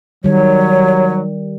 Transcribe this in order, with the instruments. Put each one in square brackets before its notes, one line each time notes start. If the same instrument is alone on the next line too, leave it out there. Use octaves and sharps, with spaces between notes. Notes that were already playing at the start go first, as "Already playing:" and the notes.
[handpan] D#3 G3 [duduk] F#3 [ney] C#5